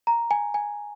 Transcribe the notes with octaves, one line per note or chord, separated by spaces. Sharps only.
A#5
G#5
G#5